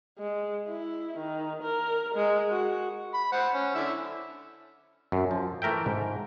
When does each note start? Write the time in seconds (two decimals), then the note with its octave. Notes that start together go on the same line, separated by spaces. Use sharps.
0.19 G#3
0.69 E4
1.18 D#3
1.63 A#4
2.15 G#3
2.51 F#4
3.14 B5
3.32 C5 F#5
3.54 C#4
3.75 D3 E4 E6
5.12 F#2
5.31 F3
5.62 E3 A3 A#4 E5 G5
5.86 G#2